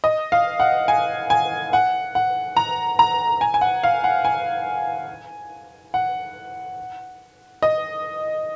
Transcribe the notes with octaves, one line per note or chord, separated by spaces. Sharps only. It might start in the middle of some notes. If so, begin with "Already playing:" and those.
D#5
F5
F#5
G#5
G#5
F#5
F#5
A#5
A#5
G#5
G#5
F#5
F5
F#5
G#5
F#5
D#5